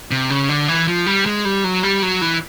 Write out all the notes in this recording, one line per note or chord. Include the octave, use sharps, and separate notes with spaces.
C3
C#3
D3
E3
F3
G3
G#3
G3
F#3
G3
F#3
E3